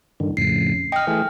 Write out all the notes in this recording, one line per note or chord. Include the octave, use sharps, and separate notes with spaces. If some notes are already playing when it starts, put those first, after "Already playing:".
G2 D3 D#3
F2 A2 C#3 C7
D#5 G5 F6
E3 A3 G#4